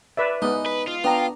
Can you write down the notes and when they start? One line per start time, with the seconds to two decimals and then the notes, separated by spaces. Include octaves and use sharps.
0.17 B4 D5 E5
0.42 G#3 B3 D#4
0.66 B4
0.87 F4
1.04 B3 D4 G5 A#5